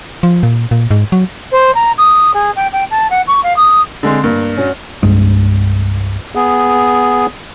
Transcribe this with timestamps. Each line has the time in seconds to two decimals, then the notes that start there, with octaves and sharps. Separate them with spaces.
0.23 F3
0.43 A#2
0.71 A#2
0.91 G#2
1.12 F#3
1.52 C5
1.75 A#5
1.98 D#6
2.34 G#4
2.56 G5
2.73 G5
2.90 A5
3.10 F#5
3.27 C#6
3.43 F5
3.56 D#6
4.03 D3 G#3 C4
4.24 G2 A#3
4.57 C#4 F#4
5.03 C2 G2 G#3
6.35 B3 G#4